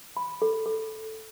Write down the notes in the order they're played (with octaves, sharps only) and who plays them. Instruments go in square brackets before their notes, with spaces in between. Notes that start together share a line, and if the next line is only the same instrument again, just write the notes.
[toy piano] B5
A4
A4